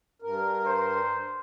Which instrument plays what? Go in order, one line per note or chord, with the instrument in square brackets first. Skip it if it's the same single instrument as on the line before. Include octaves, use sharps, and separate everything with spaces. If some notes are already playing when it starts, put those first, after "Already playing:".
[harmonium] G2 A#4
[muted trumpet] C5